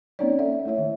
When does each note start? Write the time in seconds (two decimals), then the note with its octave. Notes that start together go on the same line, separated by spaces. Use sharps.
0.19 A#3 C4 C#4 D#4 C#5 D5
0.39 C#4 A4 D5 E5 F#5
0.65 A3 E4 C#5 E5
0.78 D#3